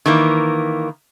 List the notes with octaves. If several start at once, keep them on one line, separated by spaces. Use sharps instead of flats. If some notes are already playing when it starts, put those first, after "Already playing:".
D#3 E3 A#3